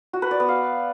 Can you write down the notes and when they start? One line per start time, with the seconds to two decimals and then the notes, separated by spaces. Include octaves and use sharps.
0.13 F#4
0.22 B4
0.31 D5
0.40 B3
0.49 F5